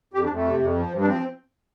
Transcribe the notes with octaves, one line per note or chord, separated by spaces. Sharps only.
F2 G4
D4
F2
A3
C3
F2
F3
G2
D4
F3 C4